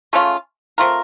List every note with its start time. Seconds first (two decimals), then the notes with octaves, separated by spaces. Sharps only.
0.13 C#3 A3 C#4 F4
0.78 A3 C4 F4 A#4